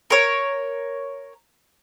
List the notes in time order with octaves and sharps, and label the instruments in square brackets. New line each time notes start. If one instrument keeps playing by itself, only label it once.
[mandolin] A#4 C#5